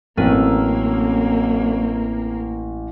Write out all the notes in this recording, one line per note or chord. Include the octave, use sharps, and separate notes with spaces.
A1 F#2 A#3 C4 A4 A#4